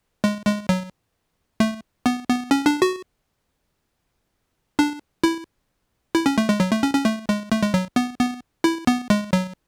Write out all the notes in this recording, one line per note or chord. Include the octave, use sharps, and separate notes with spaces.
G#3
G#3
F#3
A3
B3
B3
C#4
D4
F#4
D4
E4
E4
C#4
A3
G#3
F#3
A3
C#4
C#4
A3
G#3
A3
G#3
F#3
B3
B3
E4
B3
G#3
F#3